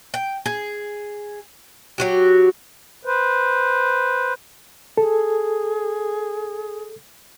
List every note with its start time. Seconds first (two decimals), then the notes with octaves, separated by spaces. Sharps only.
0.14 G5
0.46 G#4
1.98 F#3 F#4 G4
3.05 B4 C5
4.98 G#4 A4